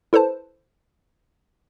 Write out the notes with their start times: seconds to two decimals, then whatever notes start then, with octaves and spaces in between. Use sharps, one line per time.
0.13 E4 A4 B4 C5 A5